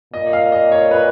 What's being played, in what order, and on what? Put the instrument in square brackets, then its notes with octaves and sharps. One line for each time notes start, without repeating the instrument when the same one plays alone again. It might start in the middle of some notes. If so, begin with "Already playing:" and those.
[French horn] A#2 [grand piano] D#5
[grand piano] F5
D#5
C#5
B4